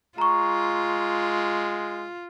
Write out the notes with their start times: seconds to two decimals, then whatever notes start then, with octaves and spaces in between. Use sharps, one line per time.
0.18 G#3 F4 A#5 C#6